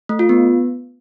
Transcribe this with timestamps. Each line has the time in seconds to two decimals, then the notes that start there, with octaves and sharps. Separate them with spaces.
0.09 A3
0.19 F4
0.29 B3